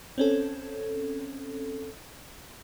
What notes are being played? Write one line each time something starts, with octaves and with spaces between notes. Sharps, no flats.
C4 C#4 A4